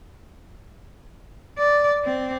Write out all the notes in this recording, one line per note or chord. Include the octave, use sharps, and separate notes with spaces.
D5
C4